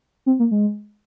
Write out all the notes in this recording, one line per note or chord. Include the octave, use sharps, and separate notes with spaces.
C4
A#3
G#3